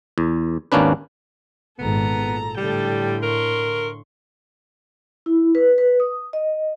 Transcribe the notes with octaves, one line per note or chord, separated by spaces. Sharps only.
E2
G#1 D#2 A#3 C#4 D4 B4
G#1 A#2 B3 A4 A#5
A#2
A2 D3 G3 A4 G5
A#4 C6 C#6
E4
B4
B4
D#6
D#5